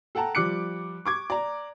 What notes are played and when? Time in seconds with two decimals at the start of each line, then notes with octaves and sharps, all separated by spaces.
0.15 A4 F#5 G5 A5 A#5
0.35 F3 G3 D6 F#6 C#7
1.05 C#6 D6 G#6
1.30 D5 A#5